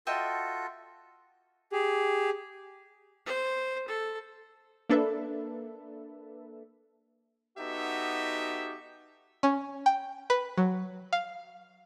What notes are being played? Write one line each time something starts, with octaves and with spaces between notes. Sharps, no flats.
F4 F#4 A4 D#5 E5 G5
G4 G#4
C5
A4
A#3 D4 A4 B4 E5
B3 D#4 F#4 G4 A4 E5
C#4
G5
B4
F#3
F5